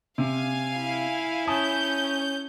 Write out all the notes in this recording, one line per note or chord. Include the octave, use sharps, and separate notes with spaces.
C3 F5 G#5
E4
C#4 G#5 A5 D#6 G6